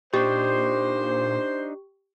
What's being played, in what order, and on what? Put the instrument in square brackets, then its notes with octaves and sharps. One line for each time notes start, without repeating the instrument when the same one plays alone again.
[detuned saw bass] A#2 [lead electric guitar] D4 D#4 [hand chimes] G4 [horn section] C5